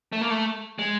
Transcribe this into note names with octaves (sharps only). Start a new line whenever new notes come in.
A3
A#3
A3
G#3